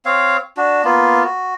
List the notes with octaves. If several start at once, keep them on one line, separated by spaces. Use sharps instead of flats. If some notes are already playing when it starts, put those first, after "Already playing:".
C4 C#5 F5
D4 F#4
A#3 B3 F4
F#4